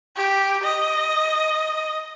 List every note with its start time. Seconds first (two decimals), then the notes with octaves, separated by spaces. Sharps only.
0.17 G4
0.64 D#5